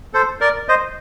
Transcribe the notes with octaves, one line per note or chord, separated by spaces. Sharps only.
A4 C5
A#4 D5
C5 D#5